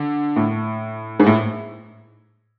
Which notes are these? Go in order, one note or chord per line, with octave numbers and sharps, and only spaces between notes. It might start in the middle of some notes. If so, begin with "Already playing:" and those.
Already playing: D3
A2
G#2
A2